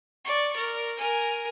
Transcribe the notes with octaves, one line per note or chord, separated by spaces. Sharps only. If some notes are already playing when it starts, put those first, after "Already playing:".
D5 C#6
A#4
A#4 G#5